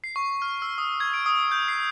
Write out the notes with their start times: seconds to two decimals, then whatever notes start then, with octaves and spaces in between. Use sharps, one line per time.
0.04 C7
0.16 C#6
0.42 F6
0.62 E6
0.78 D#6
1.00 G#6
1.14 D7
1.26 D#6
1.51 G6
1.68 C7